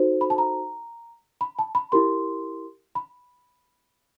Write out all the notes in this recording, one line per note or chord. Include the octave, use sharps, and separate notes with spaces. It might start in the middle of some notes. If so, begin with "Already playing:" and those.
Already playing: D#4 F#4 A4 C5
B5
A5
A#5
B5
A5
B5
E4 G4 A#4 C6
B5